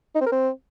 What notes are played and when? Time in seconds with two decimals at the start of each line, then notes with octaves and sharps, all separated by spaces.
0.15 D#4
0.21 C4
0.26 A#4
0.32 C4